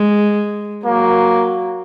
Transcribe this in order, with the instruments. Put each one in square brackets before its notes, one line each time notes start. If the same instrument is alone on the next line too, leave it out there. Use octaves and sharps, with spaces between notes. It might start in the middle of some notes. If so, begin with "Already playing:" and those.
Already playing: [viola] G#3
[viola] F#3 [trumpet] A#3